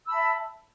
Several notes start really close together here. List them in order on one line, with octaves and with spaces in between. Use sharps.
E6 B5 A5 E5